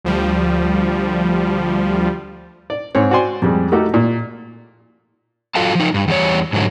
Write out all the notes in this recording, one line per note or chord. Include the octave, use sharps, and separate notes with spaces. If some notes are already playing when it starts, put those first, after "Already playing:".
D2 F3 G3
D5
G#2 C4 C#5
F#4 C5 D5 G#5 C6
F2 G3 G#3
A3 D#4 F#4 G4 A4 A#4
A#2
F#2 F4 F#4 A4 F5 A5
F3 D#4
G2
E2 G3 C#5
G#2 D3 F#3